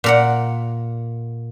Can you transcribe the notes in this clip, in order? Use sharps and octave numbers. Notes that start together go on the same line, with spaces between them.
A#2 A#4 F#5